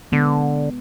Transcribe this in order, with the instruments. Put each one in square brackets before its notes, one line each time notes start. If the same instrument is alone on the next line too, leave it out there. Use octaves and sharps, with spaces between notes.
[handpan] B2 G#3 B3 [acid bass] D3